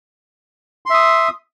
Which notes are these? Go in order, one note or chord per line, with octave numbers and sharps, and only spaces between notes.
E5 C6 D#6